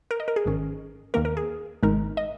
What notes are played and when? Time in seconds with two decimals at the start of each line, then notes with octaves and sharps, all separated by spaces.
0.11 A#4
0.20 D#5
0.28 A#4
0.36 G#4
0.45 G#1 G#2 D#3 C#4
1.14 D#2 D#3 A#3 A#4
1.25 A#4
1.37 G#4
1.83 G#1 G#2 D#3 G#3 D#4 A#4
2.17 D#5